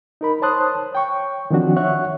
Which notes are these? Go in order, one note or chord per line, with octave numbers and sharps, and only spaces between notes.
D#4 A#4 B5
C5 C#5 A5 C6 D#6 F#6
C#5 G5 C#6
D#3 F3 C4 D4 F#4
C#5 E5 F#5 C#6 F#6